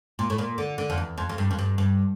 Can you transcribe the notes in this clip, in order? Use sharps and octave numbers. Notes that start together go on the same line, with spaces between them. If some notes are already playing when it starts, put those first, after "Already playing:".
A#2
A2
A#2
D3
D3
F2
E2
F2
F2
G2
F2
G2
G2